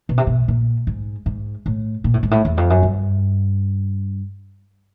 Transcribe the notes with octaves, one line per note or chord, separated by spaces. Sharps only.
B2
C3
B2
A#2
G#2
G#2
A2
A#2
A2
G#2
A2
E2
F2
F#2
G2